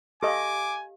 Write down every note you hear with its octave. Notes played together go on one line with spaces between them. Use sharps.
G4 A4 D#5 F5 G#5 D6